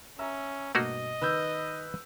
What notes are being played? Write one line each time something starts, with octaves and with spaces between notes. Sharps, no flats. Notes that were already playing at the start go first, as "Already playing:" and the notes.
C#4 E5 A#5 E6
G2 B2 A3 A#3 F#4 D#5
D#3 B4 E6 G6